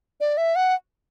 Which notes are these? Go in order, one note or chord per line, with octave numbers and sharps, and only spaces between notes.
D5
E5
F#5